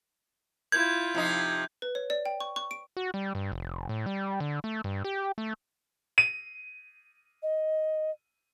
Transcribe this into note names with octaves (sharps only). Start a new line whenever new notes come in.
E4 F4 G6 G#6
C3 F3 D#4
B4
C#5
D5
G5
C#6
C#6
D7
F#4
G3
G2
F1
A2
G3
D3
A3
G2
G4
A3
D#7
D#5